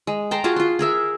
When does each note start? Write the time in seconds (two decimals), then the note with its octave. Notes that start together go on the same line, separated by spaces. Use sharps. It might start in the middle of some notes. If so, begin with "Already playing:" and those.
0.07 G#3
0.31 G5 A5 A#5 C6
0.44 F4 F#4 G#4 A5
0.56 F4 C6
0.79 G#4 A#4 E5